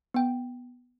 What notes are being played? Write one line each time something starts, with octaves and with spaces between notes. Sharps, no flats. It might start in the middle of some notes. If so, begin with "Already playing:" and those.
B3 G5